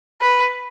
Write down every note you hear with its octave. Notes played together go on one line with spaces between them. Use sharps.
B4